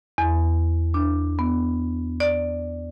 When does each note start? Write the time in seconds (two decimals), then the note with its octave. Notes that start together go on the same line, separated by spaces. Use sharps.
0.18 E2
0.94 D4
1.39 B3
2.20 D5